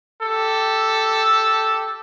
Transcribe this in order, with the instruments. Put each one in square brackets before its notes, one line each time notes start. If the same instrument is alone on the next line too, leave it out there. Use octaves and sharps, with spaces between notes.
[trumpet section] G4 A4